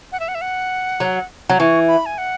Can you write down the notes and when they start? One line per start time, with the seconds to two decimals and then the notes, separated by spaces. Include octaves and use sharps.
0.12 F#5
0.20 E5
0.28 F#5
0.35 E5
0.41 F#5
1.00 F#3
1.49 F#3
1.59 E3 C#6
1.88 B5
2.06 G#5
2.18 F#5